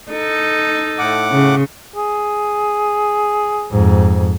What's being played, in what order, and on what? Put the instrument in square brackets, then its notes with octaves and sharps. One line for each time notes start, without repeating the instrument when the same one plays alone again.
[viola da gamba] D#4 A4
[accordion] A2 F#5 D6
[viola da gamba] C#3
[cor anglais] G#4
[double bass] F2 G#2